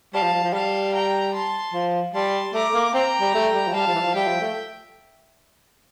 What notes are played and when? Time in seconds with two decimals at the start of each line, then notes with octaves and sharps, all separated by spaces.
0.13 G3 F5 A5
0.23 F3
0.33 F3
0.44 F3
0.53 G3 F5 A5
0.93 G5 A#5
1.33 A5 C6
1.73 F3
2.13 G3 A5 C6
2.54 A3 A#5 D6
2.74 A#3
2.93 C4 G5 A#5
3.21 G3
3.34 A3
3.54 G3
3.68 F3
3.74 G3 F5 A5
3.87 F3
3.94 E3
4.01 F3
4.14 G3 E5 G5
4.27 F3
4.41 A3